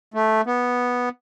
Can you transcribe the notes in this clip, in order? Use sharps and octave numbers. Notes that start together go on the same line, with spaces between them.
A3
B3